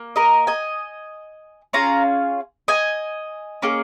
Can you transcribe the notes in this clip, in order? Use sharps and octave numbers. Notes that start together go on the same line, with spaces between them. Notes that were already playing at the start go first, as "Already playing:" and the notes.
Already playing: A#3
A#4 D#5
D#5 G#5
C#4 F4 G#4 F5 A#5
D#5 G#5
A#3 C#4 G#4